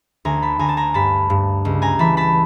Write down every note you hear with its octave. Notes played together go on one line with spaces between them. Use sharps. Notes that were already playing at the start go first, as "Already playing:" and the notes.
D2 G#5 A#5
A5 B5
D2 G#5 A#5
A5
G#5 A#5
G2 A5 B5
G2
C#2
G#5 A#5
E3 A5 B5
A5 B5